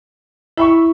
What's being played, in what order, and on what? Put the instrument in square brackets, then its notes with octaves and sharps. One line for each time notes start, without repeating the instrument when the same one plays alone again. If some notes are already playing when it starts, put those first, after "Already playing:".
[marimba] E4 [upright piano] E5 B5 C#6